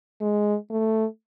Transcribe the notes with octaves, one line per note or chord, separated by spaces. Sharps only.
G#3
A3